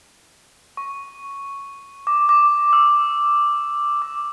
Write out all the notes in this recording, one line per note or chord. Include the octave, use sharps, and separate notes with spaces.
C#6
D6
D6
E6
D6